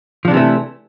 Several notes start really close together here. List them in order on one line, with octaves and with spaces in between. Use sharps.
F3 D4 C3 E3 A3